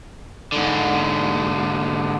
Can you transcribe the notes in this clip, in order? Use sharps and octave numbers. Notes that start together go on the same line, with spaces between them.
G#2 D3